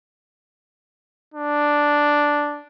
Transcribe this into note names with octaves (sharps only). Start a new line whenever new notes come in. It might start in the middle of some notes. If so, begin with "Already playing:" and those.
D4